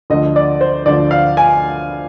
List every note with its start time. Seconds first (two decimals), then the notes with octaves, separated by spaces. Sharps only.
0.10 D2 D3 F3 D#5
0.36 D5
0.61 C5
0.86 D2 D3 F3 D5
1.11 F5
1.37 G#5